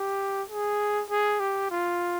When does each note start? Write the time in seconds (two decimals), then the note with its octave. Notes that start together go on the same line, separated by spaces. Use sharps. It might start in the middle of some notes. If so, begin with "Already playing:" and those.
Already playing: G4
0.49 G#4
1.10 G#4
1.40 G4
1.70 F4